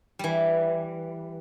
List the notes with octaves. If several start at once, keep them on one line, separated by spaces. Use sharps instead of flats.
E3 G3